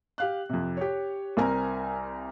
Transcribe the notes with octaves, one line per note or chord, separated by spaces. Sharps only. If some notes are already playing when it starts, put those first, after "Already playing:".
G4 F5 F#6
F2 C3
G4 C#5
C2 C4 A#4 G#5 A#5